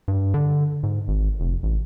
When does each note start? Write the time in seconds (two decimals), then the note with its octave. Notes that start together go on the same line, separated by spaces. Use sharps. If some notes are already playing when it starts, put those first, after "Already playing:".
0.08 G2
0.34 D3
0.83 G#2
1.08 G#1
1.40 F1
1.63 A1